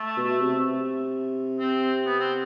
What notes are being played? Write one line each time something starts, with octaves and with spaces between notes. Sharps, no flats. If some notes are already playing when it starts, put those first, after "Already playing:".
Already playing: A3
B2
C3
C4
B3
C4